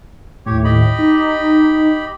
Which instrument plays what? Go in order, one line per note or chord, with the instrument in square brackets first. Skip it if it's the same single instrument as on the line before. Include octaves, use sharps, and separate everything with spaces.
[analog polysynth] D#2 A2 [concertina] G4 C#5
[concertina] G4 D#5 B5
[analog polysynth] D#4